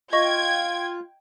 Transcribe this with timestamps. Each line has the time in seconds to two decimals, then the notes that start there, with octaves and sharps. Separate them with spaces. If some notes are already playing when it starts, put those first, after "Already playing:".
0.13 F4 D#5 G5 C#6 G#6 A#6